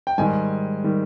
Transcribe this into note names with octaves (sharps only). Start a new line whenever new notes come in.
G5
G#2 D#3 G3 G#5
D#3 G3